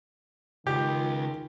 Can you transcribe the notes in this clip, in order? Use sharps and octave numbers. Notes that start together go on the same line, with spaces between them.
C#2 D#3 F4 G4